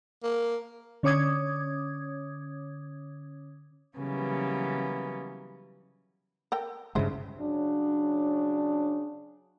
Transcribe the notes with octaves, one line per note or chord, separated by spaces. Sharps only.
A#3
D3 C#4 C#5 D6 D#6 G#6
C#3 E3 F#3 G3 A#3 B3
A4 A#4 G5
G2 C#3 G#3 E4 C5
C#3 F#3 D4